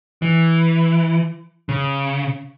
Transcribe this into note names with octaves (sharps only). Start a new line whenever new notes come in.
E3
C#3